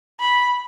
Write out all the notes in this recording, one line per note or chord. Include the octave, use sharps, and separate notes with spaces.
B5